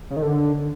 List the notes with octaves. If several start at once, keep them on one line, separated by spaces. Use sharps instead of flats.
C#3
D#3
D3